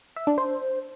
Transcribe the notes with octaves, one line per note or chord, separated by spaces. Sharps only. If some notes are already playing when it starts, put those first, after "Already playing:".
E5
D4
C5